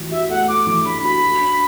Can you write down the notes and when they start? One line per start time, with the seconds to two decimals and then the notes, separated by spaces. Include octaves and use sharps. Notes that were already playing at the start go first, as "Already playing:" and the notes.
Already playing: E3 F#4
0.11 F#4 E5
0.30 A3 F#5
0.48 A3 D6
0.67 E3 D6
0.85 D4 B5
1.04 F#4 B5
1.22 F#4
1.41 D4